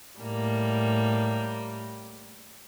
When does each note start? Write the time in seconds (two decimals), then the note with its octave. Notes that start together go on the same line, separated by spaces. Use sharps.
0.20 A2 G3 A#3